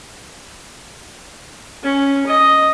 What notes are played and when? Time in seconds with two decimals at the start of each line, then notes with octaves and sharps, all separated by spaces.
1.83 C#4
2.27 D#5